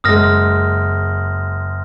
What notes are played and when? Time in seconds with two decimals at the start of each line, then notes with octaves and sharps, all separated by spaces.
0.04 F#1 G#3 D#6 F6 A#6